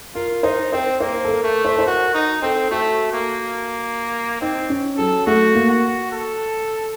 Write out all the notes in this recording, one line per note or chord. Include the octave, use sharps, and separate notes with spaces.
F4 A#4
D#4 C5
C4 C5
A#3 C5
A4
A#4
A3
C5
A#4
C5
F#4 A#4
D#4
C4 A4
A3 F#4
A#3
C4 D#4
C#4
F#3 A4
A3 F#4
A#3
F#4
A4